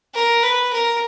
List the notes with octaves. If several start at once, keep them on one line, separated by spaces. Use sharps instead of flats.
A#4
B4
A#4